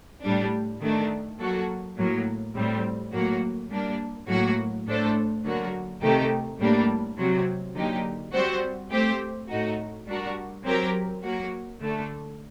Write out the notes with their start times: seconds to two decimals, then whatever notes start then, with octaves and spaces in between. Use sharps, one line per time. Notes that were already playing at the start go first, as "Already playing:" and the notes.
0.23 A2 G3 D4
0.81 D#3 A3 D4
1.39 F#3 A#3 F#4 A4
1.97 A2 F#3 A#3
2.55 A2 G3 C4
3.12 A2 F#3 A#3 F#4
3.71 G3 A#3 D4
4.28 A2 F#3 A#3 F#4
4.87 A2 A3 D4 A4 C5
5.43 D3 F#3 A#3 F#4 A#4
6.02 C3 D#3 A3 D#4 G4
6.60 A2 G3 A#3 D4
7.17 C3 F#3 C4 F#4
7.75 D3 F#3 A#3 D#4 G4
8.33 G3 C4 F#4 C5
8.91 A3 C4 G4 C5
9.49 A2 A3 D#4 F#4
10.06 G3 D4 F#4 A#4
10.65 F#3 C4 G4 A#4
11.23 F#3 A#3 F#4
11.80 D3 A3 D4 A4